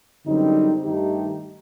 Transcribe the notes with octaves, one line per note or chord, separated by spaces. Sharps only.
F#2 D3 G3 C4 D#4
G2 D#3 A3 D#4 G4